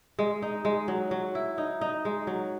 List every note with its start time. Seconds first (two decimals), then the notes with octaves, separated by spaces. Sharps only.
0.19 G#3
0.42 D#4
0.65 G#3
0.88 F#3
1.11 F#3
1.35 E4
1.58 D#4
1.81 D#4
2.05 G#3
2.27 F#3